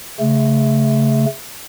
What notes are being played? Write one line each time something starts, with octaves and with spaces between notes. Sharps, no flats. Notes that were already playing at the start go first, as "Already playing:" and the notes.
C#3 A3